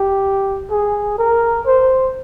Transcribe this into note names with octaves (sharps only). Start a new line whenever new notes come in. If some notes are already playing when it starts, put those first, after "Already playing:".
Already playing: G4
G#4
A#4
C5